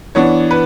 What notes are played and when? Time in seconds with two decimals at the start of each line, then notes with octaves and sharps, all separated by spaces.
0.15 E3 B3 D4 C#5
0.51 B4